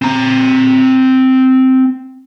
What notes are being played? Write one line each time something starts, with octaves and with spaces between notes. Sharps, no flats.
C4 A#5